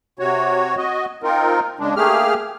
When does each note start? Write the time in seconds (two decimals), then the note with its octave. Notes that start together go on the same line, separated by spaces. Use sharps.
0.19 C3 F#4 C#5
0.77 F#4 D#5
1.23 C4 D#4 F4 A#4
1.79 C#3 G#3 D4
1.96 A3 A#3 G4 G#4 F6